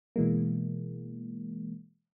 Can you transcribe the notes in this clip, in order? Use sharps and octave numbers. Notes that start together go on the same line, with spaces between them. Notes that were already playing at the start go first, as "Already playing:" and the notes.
B2 E3 G#3 A#3